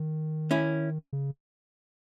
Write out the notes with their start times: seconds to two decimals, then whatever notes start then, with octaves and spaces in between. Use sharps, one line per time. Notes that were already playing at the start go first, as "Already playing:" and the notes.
Already playing: D#3
0.51 C#4 E4
1.13 C#3